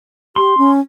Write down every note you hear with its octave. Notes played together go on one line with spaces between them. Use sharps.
G4 C6
C#4